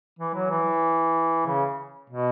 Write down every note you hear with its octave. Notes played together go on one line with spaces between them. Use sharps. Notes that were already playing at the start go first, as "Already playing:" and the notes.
E3
F#3
E3
C#3
B2